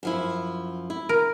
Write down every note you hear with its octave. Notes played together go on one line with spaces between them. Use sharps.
F#2 F3 E4
E4
A#4